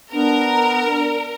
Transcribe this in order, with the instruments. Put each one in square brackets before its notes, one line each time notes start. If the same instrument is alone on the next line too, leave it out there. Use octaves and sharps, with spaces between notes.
[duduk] B3 [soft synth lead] D4 [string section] A#4